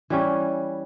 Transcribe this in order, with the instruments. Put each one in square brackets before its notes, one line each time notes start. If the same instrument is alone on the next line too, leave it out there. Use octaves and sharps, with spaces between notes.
[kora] E3 G3 C#4